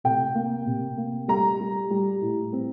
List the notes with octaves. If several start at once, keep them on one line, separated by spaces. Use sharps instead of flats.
C3 G5
A#3
C3
A#3
G3 A#5
G3
G3
A2
C4